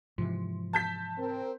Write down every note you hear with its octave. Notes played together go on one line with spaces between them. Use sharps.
G#2 C3 E3 F3
A5 G6 B6
C4 A#4